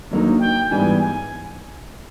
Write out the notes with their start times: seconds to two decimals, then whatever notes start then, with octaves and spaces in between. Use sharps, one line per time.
0.11 D#2 D3 F#3 A#3 D#4
0.40 G5
0.70 G#2 E3 G3 B3 G#5
1.00 G#5